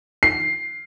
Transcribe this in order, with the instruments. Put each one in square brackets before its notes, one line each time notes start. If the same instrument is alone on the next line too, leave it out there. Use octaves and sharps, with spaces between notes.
[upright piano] C7